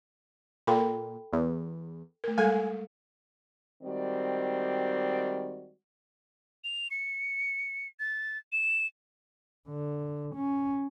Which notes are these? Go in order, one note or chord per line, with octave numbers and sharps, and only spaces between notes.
A#2 A4 G5 B5
E2
A3 A#4
G3 G#3 A4 G#5
D#3 G3 G#3 C4 F#4 D5
F7
C#7
A6
E7
D3
C#4